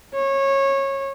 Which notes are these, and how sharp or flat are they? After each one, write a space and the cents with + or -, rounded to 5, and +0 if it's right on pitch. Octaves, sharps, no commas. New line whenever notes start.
C#5 -20